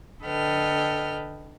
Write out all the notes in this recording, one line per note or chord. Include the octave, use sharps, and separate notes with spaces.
D3 A4 B4 D#5 G5 F6